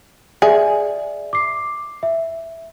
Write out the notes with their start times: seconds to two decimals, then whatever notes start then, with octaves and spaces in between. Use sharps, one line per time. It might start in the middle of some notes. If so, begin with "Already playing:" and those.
0.42 G#4 D5 E5
1.33 D6 C7
2.03 E5